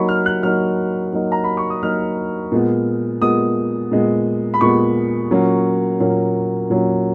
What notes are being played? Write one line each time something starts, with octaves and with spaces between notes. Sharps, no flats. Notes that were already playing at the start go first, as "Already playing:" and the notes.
Already playing: F#3 A#3 D#4 B5 C#6
F6
F#6
F#3 A#3 D#4 F6
F#3 A#3 D#4
A#5
B5
C#6
D#6
F#3 A#3 D#4 F6
A#2 G#3 B3
A#2 G#3 B3 D#6
A#2 G#3 B3
B5
A#2 G#3 B3 C#6
A#2 F#3 A#3 C#4
A#2 F#3 A#3 C#4
A#2 F#3 A#3 C#4